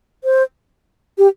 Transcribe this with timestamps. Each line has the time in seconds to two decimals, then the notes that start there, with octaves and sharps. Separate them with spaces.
0.24 C5
1.18 G4